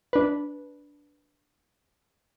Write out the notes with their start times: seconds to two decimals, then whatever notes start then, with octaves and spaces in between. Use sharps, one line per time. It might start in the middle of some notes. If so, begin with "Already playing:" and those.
0.13 D4 B4